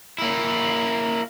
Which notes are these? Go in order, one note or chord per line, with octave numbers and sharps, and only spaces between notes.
A#3 E4